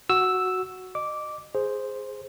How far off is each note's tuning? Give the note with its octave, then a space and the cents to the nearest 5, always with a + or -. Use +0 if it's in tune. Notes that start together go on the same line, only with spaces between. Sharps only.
F#4 +0 E6 +0
D#5 -30 D6 -10
G#4 +0 C5 +0